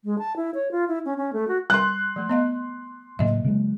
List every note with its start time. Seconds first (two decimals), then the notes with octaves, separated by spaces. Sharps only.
0.04 G#3
0.19 A5
0.36 E4
0.54 C#5
0.71 F4
0.88 E4
1.05 C#4
1.17 C#4
1.33 A3
1.48 F#4
1.70 G3 A#4 C6 F#6
2.16 F3 A3
2.29 B3 D#5 F5
3.19 A2 C#3 F#3 A#3 D#5 E5
3.44 C#3 F#3 G#3